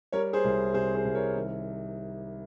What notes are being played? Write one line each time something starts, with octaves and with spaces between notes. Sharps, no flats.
G3 A#4 C#5
G#4 C5
C2
C3 G#4 C5
G#4 C5
C2
A#4 C#5
D#3